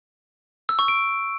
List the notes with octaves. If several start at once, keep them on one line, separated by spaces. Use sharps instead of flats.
E6
C#6
D7